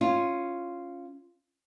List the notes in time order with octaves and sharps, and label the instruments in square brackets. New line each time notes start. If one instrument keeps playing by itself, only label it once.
[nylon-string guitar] C#4 F4